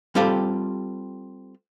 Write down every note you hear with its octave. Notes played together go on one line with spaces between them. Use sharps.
G3 C4 F4 G4 A4